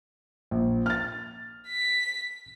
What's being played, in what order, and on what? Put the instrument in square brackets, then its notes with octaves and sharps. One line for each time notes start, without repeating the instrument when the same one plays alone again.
[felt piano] A#1
F6 A6
[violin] B6